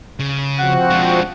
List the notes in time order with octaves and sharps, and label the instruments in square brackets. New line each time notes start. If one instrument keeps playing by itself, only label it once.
[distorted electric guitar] C#3
[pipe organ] F3 C4 F#4 [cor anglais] F#5
[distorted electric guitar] G#3 D4